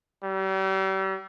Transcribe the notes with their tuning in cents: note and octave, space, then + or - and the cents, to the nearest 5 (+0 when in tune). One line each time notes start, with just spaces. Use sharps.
G3 -40